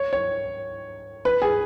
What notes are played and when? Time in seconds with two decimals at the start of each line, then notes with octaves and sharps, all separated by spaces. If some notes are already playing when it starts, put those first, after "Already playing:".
Already playing: C#5
0.13 C#5
1.25 B4
1.42 G#4